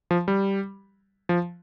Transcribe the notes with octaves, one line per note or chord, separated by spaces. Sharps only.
F3
G3
F3